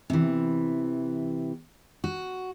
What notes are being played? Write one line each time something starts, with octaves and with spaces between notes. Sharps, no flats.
C3 E3
F#4